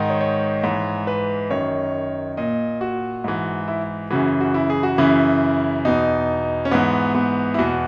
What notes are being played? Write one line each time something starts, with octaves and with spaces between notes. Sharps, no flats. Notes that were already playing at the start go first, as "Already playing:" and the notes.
Already playing: G#2 D#3
C#5
C#5
G#2 E3
B4
F#2 D#3 C#5
A#2 D#5
F#4
G#2 E3
E4
F#2 C#3 E3 F#4
F#4
E4
G#4
F#4
F#2 C#3 E3 E4
E2 B2 D#4
C#4
G#2 E3 B3
B3
E4
E2 B2 F#4